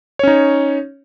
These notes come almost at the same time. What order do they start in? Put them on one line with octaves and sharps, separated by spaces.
C#5 C#4 D#4